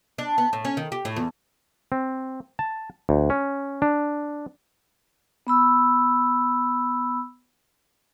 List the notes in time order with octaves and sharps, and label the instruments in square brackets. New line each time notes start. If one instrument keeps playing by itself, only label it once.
[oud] D4
B3
A2
C#4
D#3
G4
A2
E2
[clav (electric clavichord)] C4
A5
D2
C#4
D4
[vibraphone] B3 B5 E6